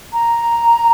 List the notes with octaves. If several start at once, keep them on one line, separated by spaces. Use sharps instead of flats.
A#5